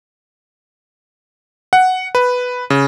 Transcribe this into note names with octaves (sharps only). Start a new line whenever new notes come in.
F#5
B4
C#3